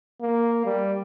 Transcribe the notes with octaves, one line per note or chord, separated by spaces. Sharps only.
A#3
G3